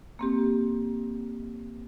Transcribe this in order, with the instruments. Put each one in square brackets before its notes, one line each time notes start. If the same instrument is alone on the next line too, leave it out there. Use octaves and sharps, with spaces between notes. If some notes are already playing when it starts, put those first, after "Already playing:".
[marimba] A#3 C4 G4